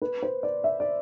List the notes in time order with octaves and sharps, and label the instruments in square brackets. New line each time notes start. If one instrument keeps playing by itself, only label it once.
[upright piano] B4
C5
D5
E5
D5